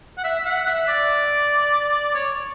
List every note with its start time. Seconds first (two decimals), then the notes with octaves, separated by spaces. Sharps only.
0.18 F#5
0.24 E5
0.39 E5
0.46 F#5
0.67 E5
0.88 D5
2.14 C#5